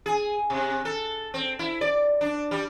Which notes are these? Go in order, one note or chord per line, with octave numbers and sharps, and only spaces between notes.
G#4
C3
A4
C4
E4
D5
D4
G3